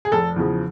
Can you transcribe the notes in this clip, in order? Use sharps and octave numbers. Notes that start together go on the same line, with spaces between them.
G#4
F1 A4
E2 C#3 F3